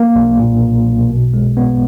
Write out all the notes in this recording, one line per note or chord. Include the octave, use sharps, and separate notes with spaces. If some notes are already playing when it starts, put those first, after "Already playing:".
Already playing: A#3
B1
A#2
B1
B1
B2
G#3
B3